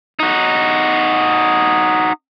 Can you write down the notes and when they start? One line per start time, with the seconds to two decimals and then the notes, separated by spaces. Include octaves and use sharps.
0.20 D#4 F#4